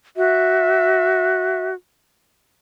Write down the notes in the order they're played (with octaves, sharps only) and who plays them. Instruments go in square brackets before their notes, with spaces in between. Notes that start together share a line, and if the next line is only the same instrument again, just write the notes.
[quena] F#4 [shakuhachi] E5